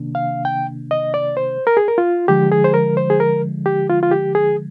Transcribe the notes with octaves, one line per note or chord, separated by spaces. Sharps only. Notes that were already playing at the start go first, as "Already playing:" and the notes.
Already playing: C3 D#3 A#3 D4
F5
G5
D#5
D5
C5
A#4
G#4
A#4
F4
D3 F3 G#3 G4
G#4
C5
A#4
C5
G#4
A#4
G4
F4
F4
G4
G#4